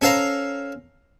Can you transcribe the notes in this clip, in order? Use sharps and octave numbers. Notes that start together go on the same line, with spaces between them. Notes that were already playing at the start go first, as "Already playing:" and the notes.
C#4 A4 C5 F5 A#5